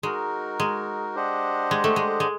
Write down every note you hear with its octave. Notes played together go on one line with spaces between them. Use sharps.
G#3 D#4 F#4 A#4
G#3
D4 G4 C5 D#5 F#5
G#3
A3
G#3
G#3